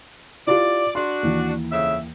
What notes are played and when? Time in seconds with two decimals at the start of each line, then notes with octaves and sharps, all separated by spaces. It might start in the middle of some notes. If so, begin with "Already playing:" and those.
0.47 E4 F4 G4 D5
0.95 D4 F#4 C6
1.23 D#2 E3
1.72 F2 C#3 E5